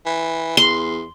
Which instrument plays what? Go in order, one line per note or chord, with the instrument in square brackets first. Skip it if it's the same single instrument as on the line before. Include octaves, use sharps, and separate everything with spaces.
[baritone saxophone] E3
[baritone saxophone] E2 [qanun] C6